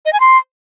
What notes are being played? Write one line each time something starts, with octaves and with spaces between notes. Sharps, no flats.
D#5
G#5
C6